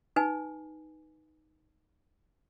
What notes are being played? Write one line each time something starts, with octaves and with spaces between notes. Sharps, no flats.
D#4 B4 G#5